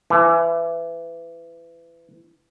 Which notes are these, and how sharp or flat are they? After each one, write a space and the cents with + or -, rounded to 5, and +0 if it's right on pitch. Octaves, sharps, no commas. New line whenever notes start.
E3 +25